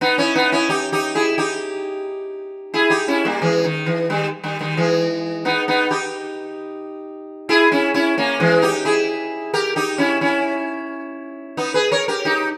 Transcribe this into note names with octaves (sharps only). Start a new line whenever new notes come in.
B3 D#4
C#4 E4
B3 D#4
C#4 E4
D#4 G4
D#4 G4
E4 G#4
D#4 G4
E4 G#4
D#4 G4
C#4 E4
G3 A#3
E3 G#3
D#3
E3
D#3 G3
D#3 G3
D#3 G3
E3 G#3
B3 D#4
B3 D#4
D#4 G4
E4 G#4
C#4 E4
C#4 E4
A#3 C#4
E3 G#3
D#4 G4
E4 G#4
G4 A#4
D#4 G4
C#4 E4
C#4 E4
B3 D#4
G#4 B4
A#4 C#5
G4 A#4
D#4 G4